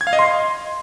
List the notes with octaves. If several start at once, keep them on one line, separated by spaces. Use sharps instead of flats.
G#6
F5
D#5
C6